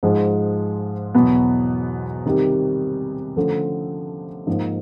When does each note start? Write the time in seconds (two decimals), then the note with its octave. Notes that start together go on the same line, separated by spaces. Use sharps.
0.03 G#2 F3 G#3
1.15 E2 B2 F#3 B3
2.26 C3 D#3 G3
3.36 D3 F3 A3 C#4
4.47 G#2 F3 A#3 D#4